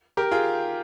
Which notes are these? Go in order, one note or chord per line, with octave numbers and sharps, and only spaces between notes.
G4 A#4
F4 G#4